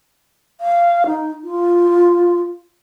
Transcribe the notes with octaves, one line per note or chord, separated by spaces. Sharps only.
F5
D#4
F4